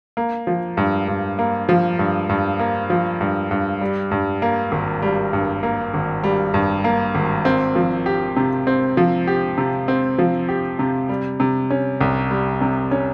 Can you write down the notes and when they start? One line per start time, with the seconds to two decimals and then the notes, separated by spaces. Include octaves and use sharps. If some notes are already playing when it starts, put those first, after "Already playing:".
0.17 A#3
0.47 F3
0.77 G2
1.08 G2
1.39 A#3
1.69 F3
1.99 G2
2.29 G2
2.59 A#3
2.90 F3
3.21 G2
3.51 G2
3.81 G3
4.11 G2
4.42 A#3
4.72 G#1
5.02 G3
5.33 G2
5.63 A#3
5.94 G#1
6.24 G3
6.54 G2
6.84 A#3
7.15 G#1
7.45 C4
7.76 F3
8.06 G4
8.36 C3
8.67 C4
8.97 F3
9.27 G4
9.58 C3
9.88 C4
10.19 F3
10.49 G4
10.79 C3
11.09 G3
11.40 C3
11.70 C#4
12.01 C2
12.31 G3
12.61 C3
12.91 C#4